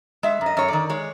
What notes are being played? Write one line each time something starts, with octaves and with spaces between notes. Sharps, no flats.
G#3 E5
F#2
D#5
F#2 C#5
D#3 D5
G#3 C#5